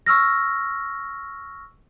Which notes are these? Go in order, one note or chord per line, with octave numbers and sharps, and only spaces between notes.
C#6 E6 F6 A#6